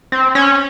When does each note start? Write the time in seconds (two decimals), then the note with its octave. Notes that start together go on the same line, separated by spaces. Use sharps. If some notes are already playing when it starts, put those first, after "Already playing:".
0.12 C4
0.35 C#4